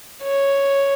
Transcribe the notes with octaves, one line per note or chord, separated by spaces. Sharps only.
C#5